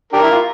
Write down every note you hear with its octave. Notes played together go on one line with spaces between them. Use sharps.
D4 G4 A#4
E4
F4